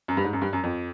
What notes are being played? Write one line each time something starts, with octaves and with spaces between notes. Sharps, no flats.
F#2
G2
G#2
F#2
G2
F#2
F2